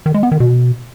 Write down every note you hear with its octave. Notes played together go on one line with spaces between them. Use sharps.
D#3
G#3
B3
D#3
B2